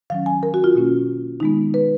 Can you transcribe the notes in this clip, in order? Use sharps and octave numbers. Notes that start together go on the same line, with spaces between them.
D#3 F#3 C#4 F5
G#5
A#4
F#4
F4
B2 A#3 C#4
D#3 G#3 B3 D#4
B4